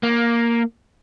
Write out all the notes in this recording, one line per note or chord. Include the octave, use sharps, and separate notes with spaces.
A#3